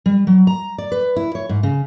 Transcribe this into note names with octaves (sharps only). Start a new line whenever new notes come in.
G3
F#3
A#5
D5
B4
E4
C#5
G#2
C#3